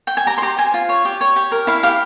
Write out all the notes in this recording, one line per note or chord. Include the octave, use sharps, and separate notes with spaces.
G5
G#5
G4 A#5
C6
G4 A#5
C5 G#5
F4
C#5
G4
C#5
G4
A#4
E4 F5
G4 F5